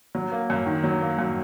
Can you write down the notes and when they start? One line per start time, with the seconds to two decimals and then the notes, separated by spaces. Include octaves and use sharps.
0.15 F#3
0.32 A#3
0.50 F#2
0.66 D#3
0.84 F#3
1.01 A#3
1.19 F#2